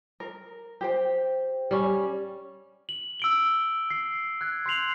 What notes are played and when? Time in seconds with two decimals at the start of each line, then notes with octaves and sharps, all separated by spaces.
0.20 A#4
0.81 G4 C5 G5
1.71 G3 C#4
2.89 F#7
3.20 E6 D7 G7
3.90 C7
4.41 F#6 G#6
4.66 C6 G6 C7 F7 F#7